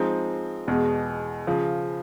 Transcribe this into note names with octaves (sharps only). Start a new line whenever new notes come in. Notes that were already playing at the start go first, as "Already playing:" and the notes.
Already playing: F3 G#3 C4 D#4
E2 B2 G#3
C#3 F3